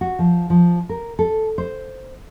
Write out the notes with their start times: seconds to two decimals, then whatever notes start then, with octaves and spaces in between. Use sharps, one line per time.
0.01 F#4
0.19 F3
0.50 F3
0.89 A#4
1.19 A4
1.58 C5